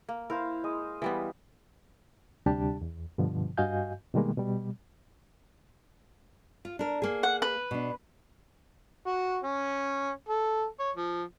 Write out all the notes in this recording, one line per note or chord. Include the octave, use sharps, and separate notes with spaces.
A#3
E4 A#4 C5 F5
G#3 D#5
E3 G3 B3
D2 C3 G3 D4 G4 A5
E2
G2 B2 D3 F3
G2 F#4 D#5 F5 G#5 G6
B2 D#3 G3 G#3 A#3
B2 G3
F4
D4 A#4
A#3 G#4
F#5
B4
B2 D4
F#4
C#4
A4
C#5
F3